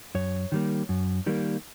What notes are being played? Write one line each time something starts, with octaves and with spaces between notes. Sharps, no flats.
F#2 C#5
D#3 G3 A#3
F#2
D#3 G3 A#3